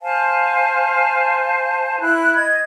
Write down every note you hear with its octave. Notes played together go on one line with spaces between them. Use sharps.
C5 F5 G#5 A5
E4 F#6
D#5 G#6